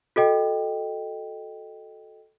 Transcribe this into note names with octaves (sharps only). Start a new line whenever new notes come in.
F#4 A4 D#5 G5